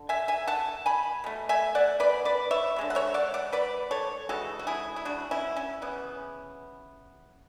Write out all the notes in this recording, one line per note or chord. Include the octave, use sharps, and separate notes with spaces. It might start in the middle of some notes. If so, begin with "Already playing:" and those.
Already playing: D3
E5 G#5
E5 G#5
F#5 A5
G#5 B5
B2 A3
E5 G#5
D5 F#5
B4 D5
B4 D5
C#5 E5
D3 G#3 B3
F#5
C#5 E5
D5 F#5
D5 F#5
B4 D5
A4 C#5
C#3 E3 G#3 F#4 A4
F#4
E4 G#4
E4
D4 F#4
C#4 E4
C#4
C#3 E3 B3